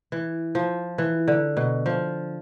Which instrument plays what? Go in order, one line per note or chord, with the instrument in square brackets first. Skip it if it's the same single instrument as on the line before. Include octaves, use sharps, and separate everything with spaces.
[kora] E3
F3
E3
D3
B2
F3